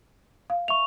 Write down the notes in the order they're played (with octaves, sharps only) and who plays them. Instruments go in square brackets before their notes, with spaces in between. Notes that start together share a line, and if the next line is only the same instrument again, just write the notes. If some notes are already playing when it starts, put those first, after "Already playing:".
[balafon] F5
[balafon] E5 [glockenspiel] C#6 F7